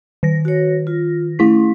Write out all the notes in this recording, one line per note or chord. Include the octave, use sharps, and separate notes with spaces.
D#3 A#6
F#4 C#5
F4
A3 C#4 E4 B6